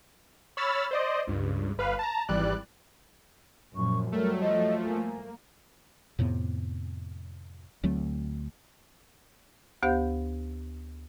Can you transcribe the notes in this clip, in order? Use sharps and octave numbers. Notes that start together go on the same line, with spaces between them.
C#5 B5 E6 F6 A6
C5 D5 D#5
C#2 G2
G1 B4 F5
A5 A#5
G#1 E3 G3 D5 F#6
F#2 A#2 F3 C#6
F#3 G3 A3 A#4
F3 A3 D#5
A#3 G#5
F2 A2 C3 B3
D2 F#3 A3 C4
D2 B3 G4 C5 F5 G6